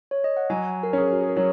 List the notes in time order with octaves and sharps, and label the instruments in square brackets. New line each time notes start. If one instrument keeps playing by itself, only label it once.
[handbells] C#5
D#5
F#5
[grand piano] F#3 [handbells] G#5
[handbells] A#4
[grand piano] C#4 G#4 [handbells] C#5
[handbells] F#4
G#4
A#4
[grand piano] F#3 [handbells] C#5